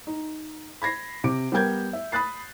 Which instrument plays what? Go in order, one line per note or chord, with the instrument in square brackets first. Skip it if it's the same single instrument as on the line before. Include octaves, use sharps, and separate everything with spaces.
[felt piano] D#4
B5 G#6 A#6 C7
C3 D6 D7
G3 B3 A#4 G5 G6 G#6
E5
B5 D#6 F#6 A6 C7